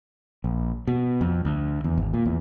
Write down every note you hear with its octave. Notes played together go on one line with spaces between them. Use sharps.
A#1
B2
F2
D2
E2
G#1
A#2
E2